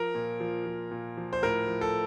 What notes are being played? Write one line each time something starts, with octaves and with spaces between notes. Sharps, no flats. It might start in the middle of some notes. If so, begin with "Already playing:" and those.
Already playing: F3 A#4
A#2
F3
F3
A#2
F3
C5
A2 A#4
F3
A4